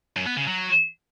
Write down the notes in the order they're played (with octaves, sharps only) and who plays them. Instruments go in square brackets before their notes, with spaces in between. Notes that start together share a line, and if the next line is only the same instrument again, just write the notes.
[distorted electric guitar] F#2
B3
C#3
F#3